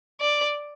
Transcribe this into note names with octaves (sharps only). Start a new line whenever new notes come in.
D5